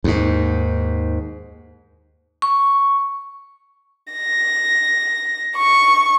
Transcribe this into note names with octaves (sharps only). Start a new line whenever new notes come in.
D#2 G#2
C#6
A#6
C#6